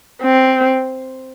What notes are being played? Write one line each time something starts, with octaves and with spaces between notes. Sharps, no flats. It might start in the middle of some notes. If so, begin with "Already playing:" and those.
C4